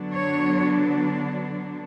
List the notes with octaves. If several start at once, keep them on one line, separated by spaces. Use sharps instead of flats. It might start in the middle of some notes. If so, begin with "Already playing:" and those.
Already playing: D3 F#3 B3 D4
C#5